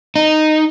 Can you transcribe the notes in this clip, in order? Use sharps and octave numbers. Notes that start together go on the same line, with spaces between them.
D#4